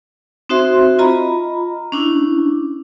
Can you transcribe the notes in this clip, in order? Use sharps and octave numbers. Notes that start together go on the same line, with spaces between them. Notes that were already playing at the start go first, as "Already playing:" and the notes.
C4 D#4 F#4 C5 E5 C6
F4 D#5 A#5 B5
C#4 D4 E4